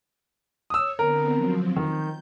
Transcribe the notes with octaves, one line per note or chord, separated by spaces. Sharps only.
C#5 D#6 E6
D3 B3 C4 A#4
F3 F#3 C4
D#3 G6